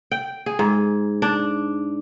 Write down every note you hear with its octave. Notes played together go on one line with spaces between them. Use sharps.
G5
G#4
G#2
D4